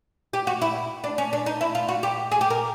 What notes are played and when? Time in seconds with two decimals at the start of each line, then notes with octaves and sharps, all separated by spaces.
0.33 G4
0.47 F#4
0.62 E4
1.04 D4
1.18 C#4
1.33 D4
1.46 D#4
1.61 E4
1.75 F4
1.89 F#4
2.03 G4
2.32 G#4
2.41 G4
2.50 A#4